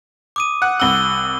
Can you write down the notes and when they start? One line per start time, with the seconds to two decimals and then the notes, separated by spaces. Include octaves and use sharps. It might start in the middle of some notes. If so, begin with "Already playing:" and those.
0.36 D6 D#6 D#7
0.62 F#5
0.80 C2 F#5 E6 G7